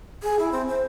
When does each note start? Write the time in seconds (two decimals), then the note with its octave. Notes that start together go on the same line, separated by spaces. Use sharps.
0.23 G#4
0.39 E4
0.52 C4
0.68 C5